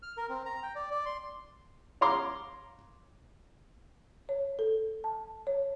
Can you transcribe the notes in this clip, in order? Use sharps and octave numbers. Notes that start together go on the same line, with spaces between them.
F6
A#4
C4
A#5
G5
D5
D5
C6
C#5 F5 A#5 C6 D6
C#5
A4
A5
C#5